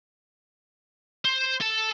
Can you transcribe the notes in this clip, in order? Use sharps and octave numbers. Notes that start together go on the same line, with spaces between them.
C5
A4 A5